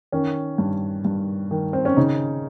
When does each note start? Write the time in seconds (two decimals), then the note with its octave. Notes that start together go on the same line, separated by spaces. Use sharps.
0.12 D#3 C#4
0.58 G2
1.05 G2
1.51 D#3
1.73 C4
1.85 C#4
1.97 C#3 D#4